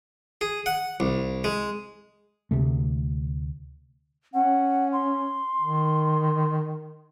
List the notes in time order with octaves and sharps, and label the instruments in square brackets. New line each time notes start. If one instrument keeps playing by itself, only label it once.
[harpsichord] G#4
F#5
C2
G#3
[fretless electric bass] D2 C3 A3
[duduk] C#4 [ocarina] F#5
[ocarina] C6
[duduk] D#3